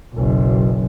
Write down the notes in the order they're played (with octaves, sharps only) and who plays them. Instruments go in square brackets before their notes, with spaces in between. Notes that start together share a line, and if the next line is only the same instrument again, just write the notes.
[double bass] F#1 B1